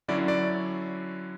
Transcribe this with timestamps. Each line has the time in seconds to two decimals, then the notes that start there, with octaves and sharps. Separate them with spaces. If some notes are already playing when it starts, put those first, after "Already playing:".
0.08 D3 F#3 C#4 E4 D5
0.28 D5